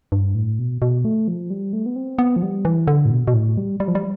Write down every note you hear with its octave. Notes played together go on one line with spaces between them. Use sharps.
G2
A2
B2
B2
A3
F3
G3
A3
B3
C4
B3
F3
G3
E3
D3
A2
B2
B2
A2
G3
G3
F3
G3